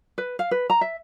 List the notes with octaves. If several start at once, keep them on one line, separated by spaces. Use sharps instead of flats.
B4
F5
B4
A#5
E5